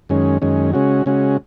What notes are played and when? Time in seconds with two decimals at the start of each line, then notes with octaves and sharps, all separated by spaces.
0.09 F#2 D#3 G#3 C#4
0.42 F#2 D#3 G#3 C#4
0.73 C#3 G#3 C#4 F#4
1.06 C#3 G#3 C#4 F#4